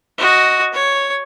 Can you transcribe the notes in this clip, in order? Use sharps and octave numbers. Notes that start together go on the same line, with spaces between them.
F#4 D#5
C#5